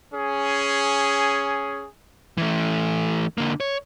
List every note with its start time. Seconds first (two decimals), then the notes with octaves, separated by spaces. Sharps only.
0.14 C#4 G#4
2.38 E3 A3
3.38 D3 A#3
3.60 C#5